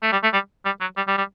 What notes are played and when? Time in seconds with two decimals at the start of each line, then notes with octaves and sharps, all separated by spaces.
0.03 A3
0.12 G3
0.23 A3
0.33 G3
0.65 G3
0.81 F#3
0.97 G3
1.08 G3
1.18 G3